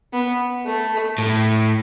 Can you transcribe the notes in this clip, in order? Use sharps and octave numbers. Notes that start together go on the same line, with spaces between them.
B3
A3
A2